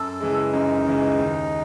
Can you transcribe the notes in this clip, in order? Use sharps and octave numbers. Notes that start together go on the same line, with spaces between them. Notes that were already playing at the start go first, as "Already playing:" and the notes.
Already playing: F#2 A4
C#3 E3 G#3
F#2 D#4
C#3 E3 G#3
D#2